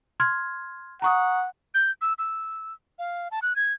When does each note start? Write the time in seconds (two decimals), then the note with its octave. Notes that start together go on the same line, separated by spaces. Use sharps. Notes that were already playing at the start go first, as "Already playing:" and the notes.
0.20 C6 F6 G#6
1.02 F#5 A#5 C#6 D#6
1.75 G6
2.02 E6
2.19 E6
2.99 F5
3.31 A5
3.42 F#6
3.56 G#6